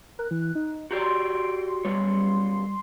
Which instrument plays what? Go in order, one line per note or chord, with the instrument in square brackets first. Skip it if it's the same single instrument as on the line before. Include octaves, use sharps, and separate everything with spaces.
[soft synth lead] A#4 [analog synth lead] F#6
[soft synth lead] E3
D#4
[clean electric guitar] F#4 G4 D5 [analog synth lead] A#5 [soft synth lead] C6
[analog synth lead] D7
[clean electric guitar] F#2 B2 C#5 [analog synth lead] G3